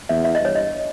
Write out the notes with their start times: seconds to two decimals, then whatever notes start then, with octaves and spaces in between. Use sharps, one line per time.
0.09 E2 E5
0.25 E5
0.35 D#5
0.40 G2 C#5
0.55 D#5